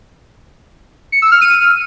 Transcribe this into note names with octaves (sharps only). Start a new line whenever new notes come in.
C#7
E6
F6
D#7